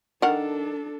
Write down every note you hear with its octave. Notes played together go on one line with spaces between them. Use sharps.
D#3 D4 A4 A#4 F#5